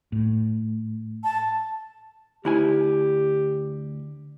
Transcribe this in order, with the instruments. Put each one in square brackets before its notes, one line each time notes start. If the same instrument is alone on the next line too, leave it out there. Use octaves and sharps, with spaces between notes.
[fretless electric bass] A2
[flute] A5
[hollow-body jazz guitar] D2 E4 G#5 [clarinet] G4